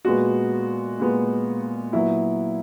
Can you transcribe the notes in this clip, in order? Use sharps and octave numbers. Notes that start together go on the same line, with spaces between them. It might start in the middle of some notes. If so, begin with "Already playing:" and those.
A#2 G#3 B3 F#4
A#2 G#3 B3
A#2 F#3 B3 E4